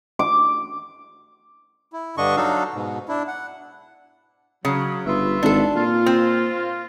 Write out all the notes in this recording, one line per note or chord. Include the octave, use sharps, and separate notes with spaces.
D6
E4
G2 D3 D4 D#5 C#6
F#3 D4 D#4 F#4 A4 F5
G#2 B2
D4 E4
F#5
C#3 F#3
G1 F4 B4 E5
G#1 D4 A4
A#2 F4
C4